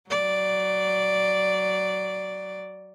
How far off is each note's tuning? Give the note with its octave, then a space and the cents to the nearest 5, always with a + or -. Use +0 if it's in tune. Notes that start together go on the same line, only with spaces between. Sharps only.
F#3 +20 D5 +0